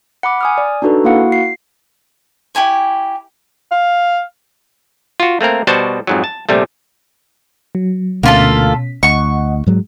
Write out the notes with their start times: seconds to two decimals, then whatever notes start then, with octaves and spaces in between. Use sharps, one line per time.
0.23 F#5 B5 D6
0.41 G#5 D#6 F6
0.58 D5
0.82 D4 D#4 F#4 A4 B4
1.04 A#3 E4 F#4 F5 F#5
1.32 C7
2.55 E4 G4 G#5 C#6
3.71 F5
5.20 F4 F#4
5.41 A3 A#3 C4 A#4
5.67 B2 G3 F#4 C5 F#5 A5
6.07 F2 G#2 F#3
6.24 A5
6.49 A#1 C3 G3 A3
7.75 F#3
8.23 D2 B2 A#3 C#4 F4 A4 B6
9.03 D2 D#5 F#5 C#6
9.67 G#2 F#3 G#3